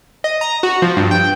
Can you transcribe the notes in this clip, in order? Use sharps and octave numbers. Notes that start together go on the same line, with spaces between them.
D#5
A#5
F#4
F3
G2
G5